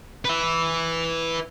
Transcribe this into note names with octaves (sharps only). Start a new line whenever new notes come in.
B4 E5